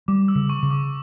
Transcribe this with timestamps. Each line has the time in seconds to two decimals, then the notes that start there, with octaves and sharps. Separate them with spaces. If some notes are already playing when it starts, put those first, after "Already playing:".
0.08 G3 D6
0.28 E6
0.35 C#3
0.49 C#6
0.63 C#3
0.70 D6